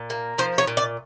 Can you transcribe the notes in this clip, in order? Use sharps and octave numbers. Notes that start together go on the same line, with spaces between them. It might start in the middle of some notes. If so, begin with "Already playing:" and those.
Already playing: A#2
A#3
F3 C5
C#5
A#2
D5